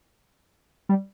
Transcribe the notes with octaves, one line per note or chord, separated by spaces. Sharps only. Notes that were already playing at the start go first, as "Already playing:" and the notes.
G3